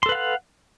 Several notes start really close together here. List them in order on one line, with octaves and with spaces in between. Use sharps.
C6 A4 B4 F5 F#5